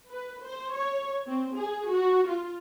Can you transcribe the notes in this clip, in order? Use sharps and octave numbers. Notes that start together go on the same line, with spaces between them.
B4
C5
C#5
C4
G#4
F#4
F4